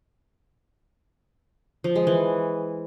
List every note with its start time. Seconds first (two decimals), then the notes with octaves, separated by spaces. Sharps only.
1.84 F3
1.96 G#3
2.07 E3